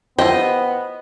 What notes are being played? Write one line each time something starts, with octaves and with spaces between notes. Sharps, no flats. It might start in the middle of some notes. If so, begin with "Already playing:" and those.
B3 E4 F4 G4 C5 D#5